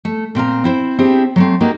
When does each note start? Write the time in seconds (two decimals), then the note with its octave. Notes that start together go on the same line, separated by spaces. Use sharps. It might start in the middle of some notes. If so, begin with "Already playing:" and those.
0.05 A3
0.35 A#2 C4 F5 A#5
0.64 C4 E4 C5
0.99 C4 D4 E4 G4 G#4
1.36 F#3 A3 C4
1.60 E3 F#3 G3 A#3 D#4